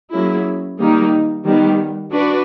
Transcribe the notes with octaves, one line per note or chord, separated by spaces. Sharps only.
F#3 A#3 C#4 E4 G#4
D#3 G3 A#3 D#4
D#3 G3 B3
D4 F#4 B4 D5